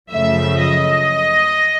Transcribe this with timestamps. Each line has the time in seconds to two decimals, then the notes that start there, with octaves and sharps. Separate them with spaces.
0.10 F#2 C#3 F3 A3 E5
0.60 D#5